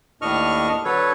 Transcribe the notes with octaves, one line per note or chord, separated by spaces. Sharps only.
D#2 A2 D4 D#5 C#6 F6
D3 F#3 A4 B4 C#5